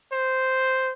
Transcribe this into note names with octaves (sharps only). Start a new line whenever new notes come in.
C5